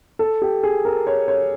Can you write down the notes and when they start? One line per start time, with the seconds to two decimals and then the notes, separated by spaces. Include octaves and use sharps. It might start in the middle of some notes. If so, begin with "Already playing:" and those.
0.19 A4
0.42 G4
0.63 G#4
0.85 A#4
1.07 C#5
1.28 C#5